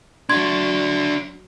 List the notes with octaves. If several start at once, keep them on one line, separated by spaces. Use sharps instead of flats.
F#3 D4 F#4 C6 G#6